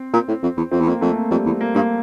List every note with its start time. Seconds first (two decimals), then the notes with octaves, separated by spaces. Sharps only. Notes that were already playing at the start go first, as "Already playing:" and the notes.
Already playing: C4
0.13 A#2
0.28 A2
0.43 F2
0.57 E2
0.72 F2 C4
0.80 E2
0.87 F2 A#3
1.01 F2 A3
1.16 A#3
1.31 F2 G3
1.46 E2
1.61 A#3
1.75 G2 A#3